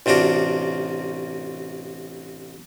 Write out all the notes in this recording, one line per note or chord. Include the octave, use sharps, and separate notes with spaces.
A1 C3 D4 F4 F#4